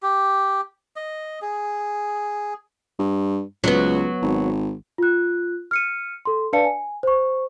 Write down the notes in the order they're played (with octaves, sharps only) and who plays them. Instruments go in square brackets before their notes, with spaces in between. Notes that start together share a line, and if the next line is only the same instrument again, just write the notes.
[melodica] G4
D#5
G#4
[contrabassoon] G2
[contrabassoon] C#2 [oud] F#3 B3
[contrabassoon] G#1
[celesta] F4 F#6
F6 C#7 D#7
A4 C6
D4 B4 D5 F5 A5 C#7
G#5
C5 C#6